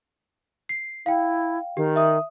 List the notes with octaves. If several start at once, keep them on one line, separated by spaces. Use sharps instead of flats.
C7
E4 F5 G5
D#3 G4
E5 D#6